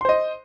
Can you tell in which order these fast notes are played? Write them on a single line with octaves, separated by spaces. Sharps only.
C6 C5 D#5